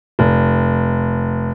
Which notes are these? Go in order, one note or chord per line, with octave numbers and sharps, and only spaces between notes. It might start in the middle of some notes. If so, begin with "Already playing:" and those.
F1